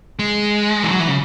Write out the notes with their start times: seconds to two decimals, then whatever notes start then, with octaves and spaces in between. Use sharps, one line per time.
0.19 G#3
0.83 E3
0.91 F#3
1.00 E3
1.08 C#3